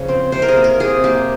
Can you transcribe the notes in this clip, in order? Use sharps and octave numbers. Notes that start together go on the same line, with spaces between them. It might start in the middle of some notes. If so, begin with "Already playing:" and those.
Already playing: C#3 F3
C4
C3 C5
A#4
G#4
A#3
A#4
C3 G#4
A#3 G4